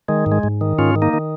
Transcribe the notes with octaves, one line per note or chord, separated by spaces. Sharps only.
D#3 G#3
G#2
G#3
G#2
D#3
G#2 C#4 F4
D#3
A#3 D#4
D#3